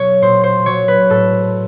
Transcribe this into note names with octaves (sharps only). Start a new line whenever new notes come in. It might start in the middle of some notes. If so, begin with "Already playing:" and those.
Already playing: B2 F#3 C#5
A#2 C5
C5
F#3 C#5
B4
A2 A4